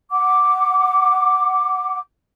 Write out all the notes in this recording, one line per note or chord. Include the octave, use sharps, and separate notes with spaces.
F#5 D6